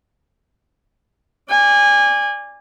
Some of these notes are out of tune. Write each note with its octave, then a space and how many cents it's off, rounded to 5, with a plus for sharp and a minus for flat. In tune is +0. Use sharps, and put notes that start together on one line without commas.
D5 +0 G#5 -25